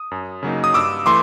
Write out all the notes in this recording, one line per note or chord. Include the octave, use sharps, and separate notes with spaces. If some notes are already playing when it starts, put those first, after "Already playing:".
Already playing: D#6
F#2
C#3 F#3 A#3 D#4
D#6
G2 D6 E6
E3 A3 C6 D6